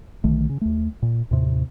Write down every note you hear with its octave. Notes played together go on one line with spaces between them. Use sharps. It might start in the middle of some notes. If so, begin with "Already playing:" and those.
B1 D3 D#3 A3
C#3
D#2 A3
A#2
D#2 A2 C3